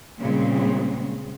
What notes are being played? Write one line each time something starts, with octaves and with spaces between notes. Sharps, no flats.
A#2 C#3 G3 G#3 C4